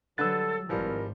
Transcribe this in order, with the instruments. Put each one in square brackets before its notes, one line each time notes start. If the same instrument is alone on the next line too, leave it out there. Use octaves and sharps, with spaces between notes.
[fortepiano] D3 B4 F#6 [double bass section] F#3 G3 [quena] A4 [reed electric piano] E6 A6
[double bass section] G#1 [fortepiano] E3 F3 G3 [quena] A#4